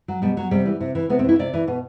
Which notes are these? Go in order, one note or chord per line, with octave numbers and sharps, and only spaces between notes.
F#3
B2 G3
F#3
C3 G3
E3
C3
E3
C3 B3
C4
E3 E4
C3 D5
E3
B2